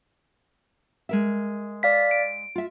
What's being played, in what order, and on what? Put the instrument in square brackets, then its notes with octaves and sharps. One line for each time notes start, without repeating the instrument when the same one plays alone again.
[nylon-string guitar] G#3 A#4 E5
[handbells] D5 F5 B6
D7
[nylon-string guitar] F4 E5